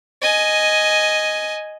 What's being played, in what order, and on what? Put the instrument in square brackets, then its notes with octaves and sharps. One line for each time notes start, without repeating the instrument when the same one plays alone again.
[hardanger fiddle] D#5 G#5